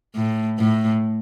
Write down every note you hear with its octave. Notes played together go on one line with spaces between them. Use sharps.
A2
A2